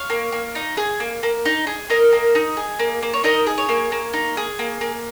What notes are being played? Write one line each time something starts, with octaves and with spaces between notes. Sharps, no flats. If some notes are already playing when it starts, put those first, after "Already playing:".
Already playing: C#5 F5
A#3
A#3
D#4
G#4
A#3
A#3
D#4
G#4
A#3 A#4 D#5
A#3
D#4
G#4
A#3
A#3
C#5
D#4 A#4 D#5
G#4
C#5
A#3
A#3
D#4
G#4
A#3
A#3